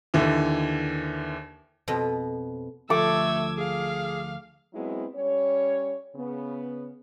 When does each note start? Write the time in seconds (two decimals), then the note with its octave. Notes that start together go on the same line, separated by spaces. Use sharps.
0.14 D#2 D3 E3
1.88 F2 B2
2.90 D2 F3 A3 A4 D6 E6 G#6
3.58 G#4 F5
4.74 F#3 G#3 B3 C4 E4
5.16 G3 C#4 C#5
6.16 C#3 B3